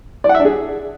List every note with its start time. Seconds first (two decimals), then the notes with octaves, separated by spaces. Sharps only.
0.24 D5
0.29 F#5
0.35 E5
0.40 D4
0.45 G#4